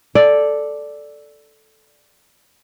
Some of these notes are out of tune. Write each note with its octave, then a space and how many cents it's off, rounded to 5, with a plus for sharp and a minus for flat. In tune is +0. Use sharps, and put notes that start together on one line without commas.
A4 +0 D5 +0